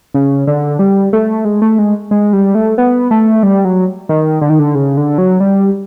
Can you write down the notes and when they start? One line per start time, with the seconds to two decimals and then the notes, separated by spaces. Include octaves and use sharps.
0.14 C#3
0.47 D3
0.79 G3
1.13 A3
1.45 G#3
1.62 A3
1.79 G#3
2.11 G#3
2.33 G3
2.55 A3
2.78 B3
3.11 A3
3.43 G3
3.65 F#3
4.09 D#3
4.41 D3
4.50 D#3
4.59 D3
4.75 C#3
4.97 D3
5.18 F#3
5.40 G3